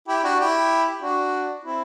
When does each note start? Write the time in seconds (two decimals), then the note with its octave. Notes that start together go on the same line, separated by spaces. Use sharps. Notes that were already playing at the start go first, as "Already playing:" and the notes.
0.08 E4 G4
0.23 D4 F#4
0.40 E4 G4
1.02 D4 F#4
1.64 C4 E4